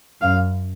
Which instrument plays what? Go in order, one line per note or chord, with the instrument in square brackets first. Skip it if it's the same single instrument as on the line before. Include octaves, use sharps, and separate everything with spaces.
[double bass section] F#2 [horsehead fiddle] F5